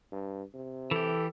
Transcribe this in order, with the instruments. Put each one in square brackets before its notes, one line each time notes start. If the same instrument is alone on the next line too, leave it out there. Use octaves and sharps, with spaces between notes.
[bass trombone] G2
C3
[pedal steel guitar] E3 G4 [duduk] A4